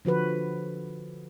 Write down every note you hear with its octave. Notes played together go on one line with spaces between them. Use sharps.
D3 F3 F#4 B4